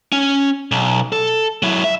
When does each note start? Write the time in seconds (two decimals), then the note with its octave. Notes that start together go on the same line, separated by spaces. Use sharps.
0.12 C#4
0.72 B1
1.12 A4
1.63 F#3 E4
1.84 E5